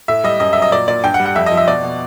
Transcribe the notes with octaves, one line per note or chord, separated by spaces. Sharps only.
A2 E5
G3 D#5
F#2 D#5
F#3 E5
D#5
A#2 D5
A#2 D5
G2 G5
F#5
G3
F#5
F2 E5
D#5
F3
E5
B2 D5
B2